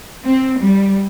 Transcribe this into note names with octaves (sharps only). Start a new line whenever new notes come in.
C4
G3